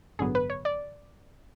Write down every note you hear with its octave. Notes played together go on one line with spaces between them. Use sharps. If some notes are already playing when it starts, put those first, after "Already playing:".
A1 G2 D3 F#3 B3 G#4
B4
C#5
D5